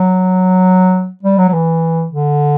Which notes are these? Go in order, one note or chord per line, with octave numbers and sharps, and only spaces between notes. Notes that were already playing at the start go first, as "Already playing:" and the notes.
Already playing: F#3
G3
F#3
F#3
E3
D3